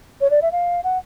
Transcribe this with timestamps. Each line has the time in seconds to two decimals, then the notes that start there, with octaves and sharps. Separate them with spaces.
0.21 C#5
0.30 D5
0.42 E5
0.52 F5
0.84 F#5